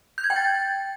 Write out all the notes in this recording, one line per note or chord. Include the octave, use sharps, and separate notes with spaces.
G6
G#6
G5
A6